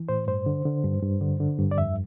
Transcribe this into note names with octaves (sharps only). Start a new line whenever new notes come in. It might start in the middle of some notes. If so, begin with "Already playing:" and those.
Already playing: E3
A2 C5
G2 C5
D3
D3
G2
G2
D3
D3
G2
D5
F2 E5